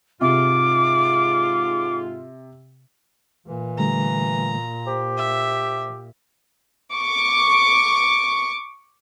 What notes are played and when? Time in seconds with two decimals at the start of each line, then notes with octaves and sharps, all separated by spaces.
0.21 G#2 C3 F4 D6
3.47 A#2 E3
3.79 D3 G3 A3 A#5
4.87 G4 C5
5.17 E5
6.93 C#6 D6